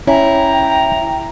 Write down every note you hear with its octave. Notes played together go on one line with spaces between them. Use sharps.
C#4 E4 G5 A#5